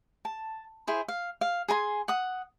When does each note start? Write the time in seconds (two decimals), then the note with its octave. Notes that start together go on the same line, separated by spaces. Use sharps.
0.25 A5
0.87 E4 G#4 C5
1.08 F5
1.41 F5
1.68 G#4 G#5 A#5 C6
2.08 F#5 D#6